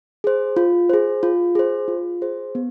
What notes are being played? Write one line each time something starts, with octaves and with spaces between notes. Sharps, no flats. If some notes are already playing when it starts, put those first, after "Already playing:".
G#4 C5
F4
G#4 C5
F4
G#4 C5
F4
G#4 C5
B3